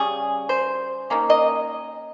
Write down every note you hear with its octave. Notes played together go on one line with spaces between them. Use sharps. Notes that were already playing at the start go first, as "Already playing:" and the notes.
Already playing: C#3 G3 C#4 G#4
C5
D#3 A#3 C#4
D#5